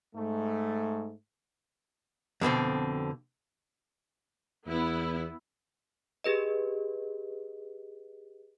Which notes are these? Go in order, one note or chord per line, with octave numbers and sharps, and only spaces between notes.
G#2 A3
F2 B2 D3 C4
E2 B3 E4
G4 G#4 B4 D#5